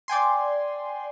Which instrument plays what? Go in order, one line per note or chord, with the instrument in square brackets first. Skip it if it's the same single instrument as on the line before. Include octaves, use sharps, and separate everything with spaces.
[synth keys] D5 G5 G#5 C6